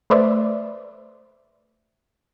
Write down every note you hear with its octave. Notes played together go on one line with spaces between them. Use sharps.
A3 B4 C5 D5 E5